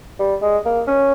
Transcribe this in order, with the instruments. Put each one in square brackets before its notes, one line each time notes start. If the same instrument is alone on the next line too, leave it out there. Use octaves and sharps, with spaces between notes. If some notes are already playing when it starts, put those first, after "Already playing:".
[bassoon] G3
G#3
A#3
C#4